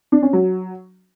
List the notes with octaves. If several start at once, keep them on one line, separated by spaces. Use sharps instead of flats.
D4
C#4
F#3